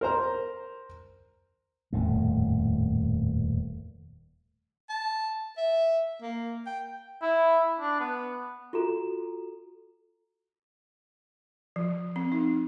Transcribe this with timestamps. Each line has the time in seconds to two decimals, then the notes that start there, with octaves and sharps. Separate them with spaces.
0.01 A#4 C5 A#5
1.93 D#1 F2 A2 A3
4.90 A5
5.58 E5
6.22 A#3
6.66 G5
7.22 E4
7.80 D4
8.00 B3
8.73 F4 F#4 A4 A#5
11.76 F3
12.16 C4
12.32 D#4